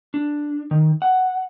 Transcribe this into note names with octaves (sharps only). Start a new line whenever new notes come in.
D4
D#3
F#5